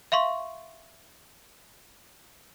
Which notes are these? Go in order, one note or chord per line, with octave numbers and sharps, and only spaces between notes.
E5 F5 C6 C#6